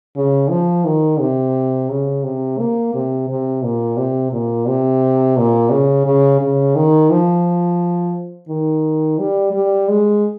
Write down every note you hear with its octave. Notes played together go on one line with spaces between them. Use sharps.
C#3
F3
D#3
C3
C#3
C3
A#3
C3
C3
A#2
C3
A#2
C3
A#2
C#3
C#3
C#3
D#3
F3
D#3
G3
G3
G#3